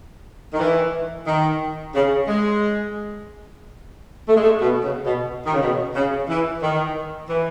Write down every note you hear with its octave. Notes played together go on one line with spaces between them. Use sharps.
D#3
E3
D#3
C#3
G#3
A3
G#3
A3
B2
C#3
B2
D#3
C#3
B2
C#3
E3
D#3
E3